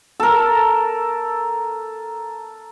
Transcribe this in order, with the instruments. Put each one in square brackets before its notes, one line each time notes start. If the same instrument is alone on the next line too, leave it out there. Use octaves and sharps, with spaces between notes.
[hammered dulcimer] A4 A#4